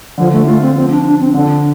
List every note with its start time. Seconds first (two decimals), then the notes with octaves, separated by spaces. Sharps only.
0.18 D3 F3
0.33 A3
0.47 A3 F4
0.62 C4
0.76 F3 C4
0.91 D4
1.05 D4
1.20 C4
1.34 D3 D4